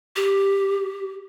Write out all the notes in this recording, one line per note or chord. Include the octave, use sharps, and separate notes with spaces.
G4